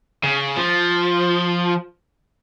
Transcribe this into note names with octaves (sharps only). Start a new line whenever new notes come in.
C#3
F3